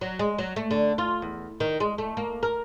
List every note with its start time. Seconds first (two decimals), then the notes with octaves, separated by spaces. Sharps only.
0.01 F#3
0.19 G#3
0.38 F#3
0.56 A3
0.71 D3
0.98 F4
1.22 E2
1.60 D#3
1.80 G#3
1.98 A3
2.17 A#3
2.43 A#4